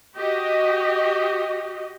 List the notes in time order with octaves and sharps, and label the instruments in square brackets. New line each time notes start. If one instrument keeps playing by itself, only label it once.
[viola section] F#4 G4 D#5